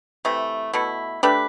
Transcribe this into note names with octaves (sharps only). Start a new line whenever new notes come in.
C3 E3 A3
B2 A3 E4
A3 D4 G4 B4